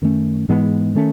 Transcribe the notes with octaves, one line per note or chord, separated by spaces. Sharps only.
F#2 D#3 A3 C#4
G#2 E3 G#3 B3
D#3 A3 C#4